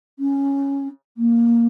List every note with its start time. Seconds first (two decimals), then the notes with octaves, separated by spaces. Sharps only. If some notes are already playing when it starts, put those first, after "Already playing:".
0.19 C#4
1.17 A#3